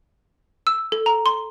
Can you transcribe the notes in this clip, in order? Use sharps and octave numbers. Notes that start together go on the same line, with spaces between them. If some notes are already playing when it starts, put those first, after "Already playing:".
E6
A4
A#5
C6